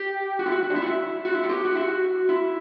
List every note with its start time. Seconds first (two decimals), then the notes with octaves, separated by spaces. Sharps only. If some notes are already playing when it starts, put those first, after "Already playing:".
Already playing: G4
0.39 F#4
0.46 E4
0.52 F#4
0.63 F#4
0.70 D4
0.76 E4
0.82 F#4
0.86 E4
1.25 F#4
1.35 E4
1.44 F#4
1.49 G4
1.65 F#4
1.75 E4
1.81 F#4
2.29 E4